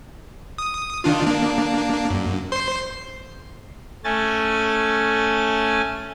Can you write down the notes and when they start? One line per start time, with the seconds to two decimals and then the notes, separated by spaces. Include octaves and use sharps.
0.58 D#6
1.04 D#3 D4 F4
1.27 A#3 D4
2.10 F#2
2.52 C5 C6
4.04 A3 C#4 G#5 A6